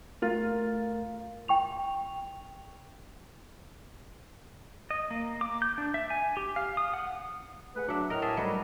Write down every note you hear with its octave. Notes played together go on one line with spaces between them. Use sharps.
A3 F4 A#4
G5 C#6 F7
D#5
A#3
D6
G6
D4
E5
G#5
G4
F5
D#6
F#5
A3 G#4 B4 F#5
F#3 D4 E5 F#5
A2 A#4 D#5 A#5 F6
G#4 A#4 D#5 E5 A5
F#3 G3 A3 D#4 B4 D#5